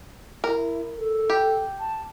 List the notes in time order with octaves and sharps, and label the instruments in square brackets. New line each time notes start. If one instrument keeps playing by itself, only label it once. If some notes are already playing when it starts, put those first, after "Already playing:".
[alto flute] E4 [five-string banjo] A#4
[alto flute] A4
[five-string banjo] G4
[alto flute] A5